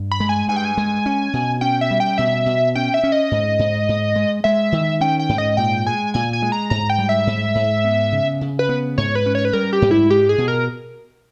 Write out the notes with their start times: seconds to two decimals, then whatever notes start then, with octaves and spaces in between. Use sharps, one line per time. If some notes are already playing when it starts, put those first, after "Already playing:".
Already playing: G2
0.11 B5
0.20 G#3
0.29 G#5
0.48 G2 G#5
0.56 G5
0.65 G#5
0.77 G#3
1.06 C#4
1.33 B2
1.61 C#4 G5
1.81 E5
1.91 G3
2.00 G5
2.18 B2 E5
2.46 B2
2.75 C#4 G5
2.94 E5
3.04 C#4
3.12 D#5
3.31 G#2
3.59 G#2
3.89 G#2
4.16 G#3
4.44 G#3 E5
4.72 D#3
5.01 C#4 G5
5.19 G5
5.29 G#2
5.38 D#5
5.57 A#2 G5
5.86 G#3 G#5
6.14 A#2 G#5
6.33 G#5
6.42 G#3
6.52 A#5
6.70 G#2 A#5
6.90 G5
6.99 G3
7.09 E5
7.27 G#2
7.55 G#2
7.85 B3
8.12 C#3
8.41 C#3
8.59 B4
8.69 B3
8.98 G#2 C#5
9.15 B4
9.26 C#4
9.35 C#5
9.45 B4
9.53 G3 A#4
9.73 G4
9.82 G#2
9.91 E4
10.10 G#3 G4
10.29 G#4
10.38 B2
10.48 A#4